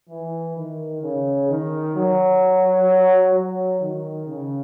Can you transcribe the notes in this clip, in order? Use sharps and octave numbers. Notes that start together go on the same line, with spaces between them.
E3
D#3
C#3
D#3
F#3
F#3
D#3
C#3